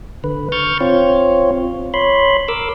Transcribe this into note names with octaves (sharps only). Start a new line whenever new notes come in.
D3 B4
C#6 F6 G6 A6
C4 F4 C#5
C#5 B5 C6
A#4 D6 E6